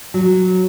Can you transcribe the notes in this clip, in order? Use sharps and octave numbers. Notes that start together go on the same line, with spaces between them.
F#3